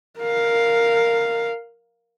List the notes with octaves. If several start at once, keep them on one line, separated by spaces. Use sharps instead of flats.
A#4 F5